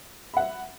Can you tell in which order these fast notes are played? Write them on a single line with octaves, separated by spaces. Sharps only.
B5 F#5 E5